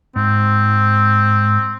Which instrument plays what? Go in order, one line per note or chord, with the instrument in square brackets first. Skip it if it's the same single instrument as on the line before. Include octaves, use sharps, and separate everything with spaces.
[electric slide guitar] G#2 [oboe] C4